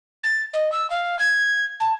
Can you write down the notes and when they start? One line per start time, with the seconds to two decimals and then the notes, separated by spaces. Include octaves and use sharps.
0.23 A6
0.53 D#5
0.71 E6
0.90 F5
1.18 G#6
1.79 A5